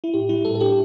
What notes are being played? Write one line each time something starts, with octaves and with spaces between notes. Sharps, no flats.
E4
A2 G4
G3 E4
A2 A4
A4
D4 G4